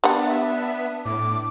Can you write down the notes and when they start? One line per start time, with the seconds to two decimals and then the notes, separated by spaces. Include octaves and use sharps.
0.04 G3 B3 D4 F#5
0.25 E5
1.05 A2 D6